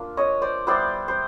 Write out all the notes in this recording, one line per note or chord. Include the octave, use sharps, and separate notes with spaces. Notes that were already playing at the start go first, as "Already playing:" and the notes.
Already playing: A#3 D4 F4
C#5 D#5
C5 D5
G3 B3 E4 C5 D5
C5